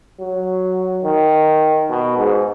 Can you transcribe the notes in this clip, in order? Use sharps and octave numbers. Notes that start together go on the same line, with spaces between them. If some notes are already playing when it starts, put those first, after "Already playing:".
F#3
D#3
B2
G#2